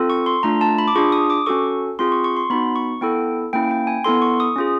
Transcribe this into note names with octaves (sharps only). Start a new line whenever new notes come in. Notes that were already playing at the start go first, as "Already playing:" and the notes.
Already playing: C4 F4 A4
C#6
C6
A3 D4 F4 A#5
A5
B5
D6
D4 F4 G#4 C#6
D#6
D6
C#4 F#4 A4 C#6
C4 F4 G#4 C6
C#6
C#6
C6
B3 D#4 F#4 B5
C#6
B3 E4 A4 G5
A#3 C#4 E4 G5
G5
G#5
B3 E4 A4 C6
C#6
D#6
C#4 F4 G#4